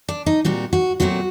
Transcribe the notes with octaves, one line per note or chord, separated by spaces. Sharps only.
D4
D#4
A#2 G3 C4 F#4
F#4
A#2 F#3 A3 C4 F#4